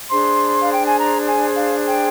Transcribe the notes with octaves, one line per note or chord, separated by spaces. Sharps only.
D4 G#4 C5 C6
F5
G5
G#5
A#5
G#5
F5
G5